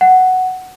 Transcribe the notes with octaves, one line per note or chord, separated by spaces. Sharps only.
F#5